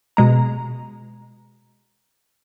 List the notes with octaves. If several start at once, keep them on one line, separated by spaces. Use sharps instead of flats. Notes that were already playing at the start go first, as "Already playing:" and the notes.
B2 G#3 A#5